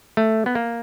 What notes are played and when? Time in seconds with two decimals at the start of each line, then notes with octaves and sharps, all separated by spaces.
0.17 A3
0.46 B3
0.55 A#3